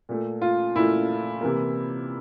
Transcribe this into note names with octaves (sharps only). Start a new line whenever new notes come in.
A#2 A3
F4
A#2 A3 E4
C3 E3 A#3